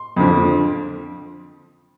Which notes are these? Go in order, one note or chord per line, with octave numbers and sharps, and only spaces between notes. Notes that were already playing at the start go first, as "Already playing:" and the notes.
Already playing: C6
F2 D3 F3